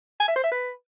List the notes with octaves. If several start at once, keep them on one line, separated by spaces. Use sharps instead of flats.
G#5
E5
C5
E5
B4